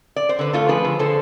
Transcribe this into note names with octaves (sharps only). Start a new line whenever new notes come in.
D5
C5
D3 B4
A3 F4 A4
F3 G#4 B4
D3
D3 A4 C5